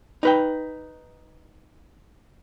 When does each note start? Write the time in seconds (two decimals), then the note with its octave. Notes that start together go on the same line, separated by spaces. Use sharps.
0.23 D#4 B4 G5